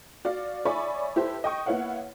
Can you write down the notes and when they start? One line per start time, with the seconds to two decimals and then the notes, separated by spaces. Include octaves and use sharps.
0.25 F#4 D5 F5
0.65 C#5 D5 E5 G#5 B5 C#6
1.16 E4 G4 A4 B4 C5
1.44 D#5 G5 C#6
1.66 A#3 B3 E4 C#5 F5 F#5